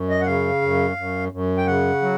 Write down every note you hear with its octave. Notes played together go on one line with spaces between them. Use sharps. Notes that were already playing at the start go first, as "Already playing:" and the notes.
Already playing: F#2
D#5
F#5
C#3 F5
F#2
F#2
F#2
G5
C#3 F#5
F#3